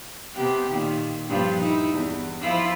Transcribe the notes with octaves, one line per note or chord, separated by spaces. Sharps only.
C3 B3 G4
A#2 D#3
G2 A#2 F3
D#4 E4
E2
F3 E4 F4